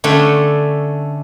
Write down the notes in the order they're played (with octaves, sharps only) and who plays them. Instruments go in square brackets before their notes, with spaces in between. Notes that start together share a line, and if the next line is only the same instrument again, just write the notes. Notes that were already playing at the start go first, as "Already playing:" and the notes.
[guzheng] D3 A3 C#4 C#5 G5